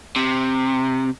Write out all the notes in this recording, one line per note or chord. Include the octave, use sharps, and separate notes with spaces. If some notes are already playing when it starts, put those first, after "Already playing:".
C3